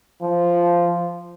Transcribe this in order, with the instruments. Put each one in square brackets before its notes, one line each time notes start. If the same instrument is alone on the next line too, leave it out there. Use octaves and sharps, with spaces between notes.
[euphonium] F3